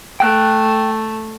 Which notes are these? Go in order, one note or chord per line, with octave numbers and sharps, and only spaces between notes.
A3 G5 F#6